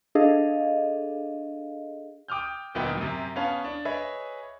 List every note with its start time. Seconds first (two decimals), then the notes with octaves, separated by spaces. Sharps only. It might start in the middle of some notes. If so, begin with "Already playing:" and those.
0.15 D4 G#4 A4 D#5 F5
2.28 G5 D6 D#6 F6 G6
2.74 D2 A#2 F#3 B3 D#4 G5
2.98 F#2 C3
3.36 B3 C#4 C#5 F5 A5
3.64 D4
3.85 G#4 B4 C#5 D#5 E5